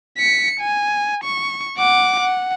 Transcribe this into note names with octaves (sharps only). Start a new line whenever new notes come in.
B6 C#7
G#5
C#6
F#5 D6
F#5